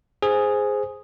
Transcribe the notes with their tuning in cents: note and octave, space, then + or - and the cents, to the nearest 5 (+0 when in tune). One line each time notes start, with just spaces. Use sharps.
G#4 +0 C5 -5